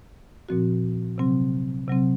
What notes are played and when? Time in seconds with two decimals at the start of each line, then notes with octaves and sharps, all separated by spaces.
0.49 A#2 F3 C4 F#4
1.18 C3 F#3 C4
1.88 C3 F#3 C4